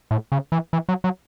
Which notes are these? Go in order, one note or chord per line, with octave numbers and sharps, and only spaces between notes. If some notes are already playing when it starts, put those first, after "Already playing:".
A2
C#3
E3
E3
F#3
F#3